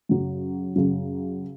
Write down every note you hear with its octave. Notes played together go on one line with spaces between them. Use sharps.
F#2 C#3 F#3
F#2 C#3 F#3